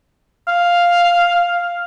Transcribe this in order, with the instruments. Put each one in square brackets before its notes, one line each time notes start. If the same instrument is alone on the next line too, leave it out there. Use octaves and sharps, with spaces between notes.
[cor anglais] F5